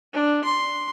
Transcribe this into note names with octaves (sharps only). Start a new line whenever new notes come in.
D4
C6